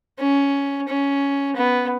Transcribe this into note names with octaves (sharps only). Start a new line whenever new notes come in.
C#4
C#4
B3